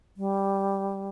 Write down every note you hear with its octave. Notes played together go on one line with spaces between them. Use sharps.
G3